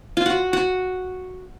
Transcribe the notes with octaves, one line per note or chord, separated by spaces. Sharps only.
F4
F#4
F#4